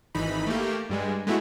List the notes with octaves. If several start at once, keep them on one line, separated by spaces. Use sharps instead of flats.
G#1 E3 D#4 B5
A3 A#3 G4
G2 G3 G#3
G#3 A3 B3 E4 F#4